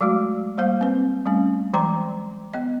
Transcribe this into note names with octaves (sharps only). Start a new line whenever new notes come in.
F#3 G#3 A3 F#4
G3 A#3 C5 F5
C4 B4
G3 A3 C#4
E3 F#3 G#3 G5 A#5 C6
B3 D#5